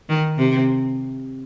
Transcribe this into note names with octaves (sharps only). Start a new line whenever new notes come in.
D#3
C3